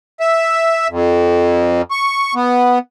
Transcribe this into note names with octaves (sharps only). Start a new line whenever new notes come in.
E5
F2
C#6
B3